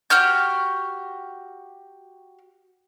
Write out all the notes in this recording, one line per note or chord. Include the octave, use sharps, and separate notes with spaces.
F#4 G4 F6 G6